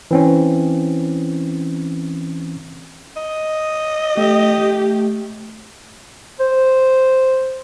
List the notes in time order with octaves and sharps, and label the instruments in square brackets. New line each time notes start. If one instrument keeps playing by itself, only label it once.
[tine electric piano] E3 C4 C#4
[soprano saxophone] D#5
[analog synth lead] A3 [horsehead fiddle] G4
[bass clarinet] C5